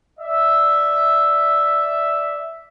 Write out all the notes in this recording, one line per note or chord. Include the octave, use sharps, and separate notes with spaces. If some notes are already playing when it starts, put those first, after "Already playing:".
D5 E5